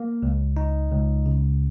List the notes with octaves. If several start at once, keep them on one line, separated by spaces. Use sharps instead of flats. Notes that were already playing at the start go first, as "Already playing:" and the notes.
Already playing: A#3
C#2
D#4
C#2
C#3